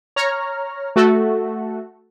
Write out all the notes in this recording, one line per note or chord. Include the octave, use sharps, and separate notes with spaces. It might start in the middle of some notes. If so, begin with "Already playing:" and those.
C#5 A#5 F6
A3 F#4 A4